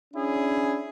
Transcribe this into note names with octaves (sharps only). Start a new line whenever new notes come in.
C#4 D4 E4 G#4